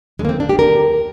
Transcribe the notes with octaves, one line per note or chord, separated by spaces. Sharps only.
D#2 D3 G#3
A#3
C4
D4
G4
D2 D3 A#4